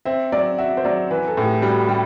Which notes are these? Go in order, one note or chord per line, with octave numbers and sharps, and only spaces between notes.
C4 E5
F#3 D5
F#4 E5
C5
F#3 D5
E3 B4
A4
A2
G4
G3 F#4
G3